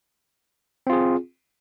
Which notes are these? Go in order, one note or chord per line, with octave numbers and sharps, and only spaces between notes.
C4 F4 G#4